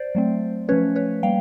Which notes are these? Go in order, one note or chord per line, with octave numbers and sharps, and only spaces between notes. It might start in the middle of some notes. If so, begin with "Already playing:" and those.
Already playing: C5 D5
F#3 A3 C4
F3 A3 C#4 B4 C#5
B4 C#5
G3 A#3 F5 G5